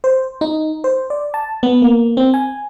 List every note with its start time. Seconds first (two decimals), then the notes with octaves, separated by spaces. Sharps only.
0.04 C5
0.41 D#4
0.84 C5
1.10 D5
1.34 A5
1.63 B3
1.82 A#3
2.17 C4
2.34 G#5